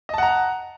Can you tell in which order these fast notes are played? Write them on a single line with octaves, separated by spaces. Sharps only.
D#5 A5 F#5 A#5